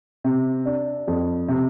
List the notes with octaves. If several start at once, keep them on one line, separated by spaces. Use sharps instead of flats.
C3
D4
F2
C3